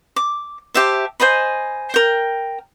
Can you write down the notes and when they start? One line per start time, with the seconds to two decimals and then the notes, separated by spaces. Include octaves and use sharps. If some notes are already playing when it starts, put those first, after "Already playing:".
0.16 D6
0.74 G4 C5 E5 A5
1.20 C5 D#5 G#5 B5
1.94 A#4 G5